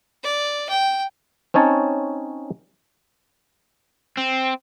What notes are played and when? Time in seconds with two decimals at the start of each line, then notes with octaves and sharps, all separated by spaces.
0.23 D5
0.69 G5
1.54 C4 C#4 D#4 C#5 A5
4.18 C4